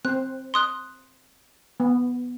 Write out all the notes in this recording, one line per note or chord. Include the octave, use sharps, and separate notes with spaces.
C4 C5 F#6
C6 D#6 F#6
B3